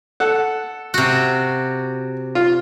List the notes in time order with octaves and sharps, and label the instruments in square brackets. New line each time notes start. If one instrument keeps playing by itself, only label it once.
[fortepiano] A4 F#5
[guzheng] C3 F#4
[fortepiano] F4